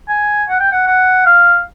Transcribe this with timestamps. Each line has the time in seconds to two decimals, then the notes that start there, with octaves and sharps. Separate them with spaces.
0.09 G#5
0.49 F#5
0.60 G5
0.72 F#5
0.87 F#5
1.26 F5